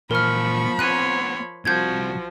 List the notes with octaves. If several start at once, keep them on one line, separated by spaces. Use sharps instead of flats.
A#2 E3 F3 A#4 B5 C#6 F6
B3 C4 C#5 C6 F#6 D#7
C2 C3 F3 F#4 G6 G#6